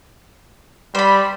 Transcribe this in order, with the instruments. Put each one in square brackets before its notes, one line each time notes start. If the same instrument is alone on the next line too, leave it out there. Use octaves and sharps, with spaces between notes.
[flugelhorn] G3 [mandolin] C5 B5